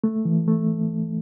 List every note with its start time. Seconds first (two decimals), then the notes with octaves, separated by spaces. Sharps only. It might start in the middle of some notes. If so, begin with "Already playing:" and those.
0.04 A3
0.25 E3
0.47 A3